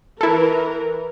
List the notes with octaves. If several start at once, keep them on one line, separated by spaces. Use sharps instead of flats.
E3 E4 A4 A#4